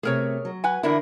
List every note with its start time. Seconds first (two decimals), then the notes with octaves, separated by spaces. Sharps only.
0.03 C3 A3 G#4 A#4 C#5
0.45 F#3
0.64 B4 F#5 G#5
0.83 E2 D3 D4 E4 A#4